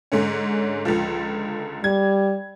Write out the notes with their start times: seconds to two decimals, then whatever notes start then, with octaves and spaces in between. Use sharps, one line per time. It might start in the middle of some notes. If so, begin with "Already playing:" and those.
0.12 G#2 D3 C#4
0.85 C#2 D3 F3
1.84 G3 G#6